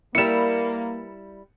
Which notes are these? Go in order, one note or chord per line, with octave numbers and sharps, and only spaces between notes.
G3 A#3 E4 A#4 B4 C#7 E7